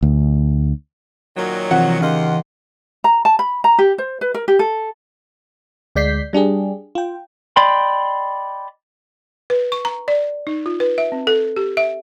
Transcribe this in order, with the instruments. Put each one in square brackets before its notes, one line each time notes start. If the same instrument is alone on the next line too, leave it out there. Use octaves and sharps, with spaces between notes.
[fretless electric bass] D2
[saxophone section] A#2 D#3 F#3
[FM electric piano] C3 F3 [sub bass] E3 [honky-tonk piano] F#5
[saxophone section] D#2 D#5 [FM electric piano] C#3 F5 C6
[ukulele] A#5
A5
B5
A#5
G4
C5
B4
A#4
G4
A4
[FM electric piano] D2 G#3 D5 G6 B6 C7
G3 D4 G4 G#4
F4 G5
[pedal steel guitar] D5 D#5 G5 B5 C6
[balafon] B4
C#6
A#5
D5
D#4
F4
B4
E5
C4
A4
G4
E5